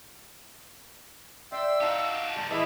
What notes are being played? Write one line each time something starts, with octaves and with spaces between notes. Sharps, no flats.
D5 E5 G5 C6 E6
D#4 F#4 G4 D#5 F5 A5
G#2 D3 G3 A5
A2 E3 E4 G#4 B4 D#5 E5